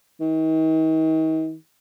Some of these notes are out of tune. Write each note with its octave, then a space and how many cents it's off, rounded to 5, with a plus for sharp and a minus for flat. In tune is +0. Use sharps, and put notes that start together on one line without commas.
D#3 +40